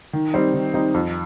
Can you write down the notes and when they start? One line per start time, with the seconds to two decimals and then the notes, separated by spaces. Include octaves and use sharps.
0.13 D#3
0.34 G3 C4 D#4
0.54 D#3
0.74 G3 C4 D#4
0.94 F2